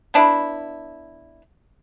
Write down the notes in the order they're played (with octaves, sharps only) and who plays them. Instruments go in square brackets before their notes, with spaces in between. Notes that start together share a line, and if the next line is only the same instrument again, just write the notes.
[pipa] B3 D4 E4